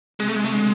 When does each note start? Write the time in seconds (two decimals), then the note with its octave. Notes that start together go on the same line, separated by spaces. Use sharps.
0.20 C3 G#3
0.28 A3
0.36 G#3
0.43 C3 A3
0.53 D3 G#3